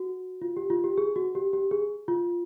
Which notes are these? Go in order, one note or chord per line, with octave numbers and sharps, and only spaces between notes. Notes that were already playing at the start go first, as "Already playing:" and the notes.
Already playing: F#4
F4
G4
F4
G4
G#4
F#4
G4
G4
G#4
F4